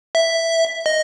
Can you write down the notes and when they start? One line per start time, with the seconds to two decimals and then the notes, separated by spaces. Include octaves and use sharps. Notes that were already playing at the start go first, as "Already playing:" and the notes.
0.15 E5
0.86 D#5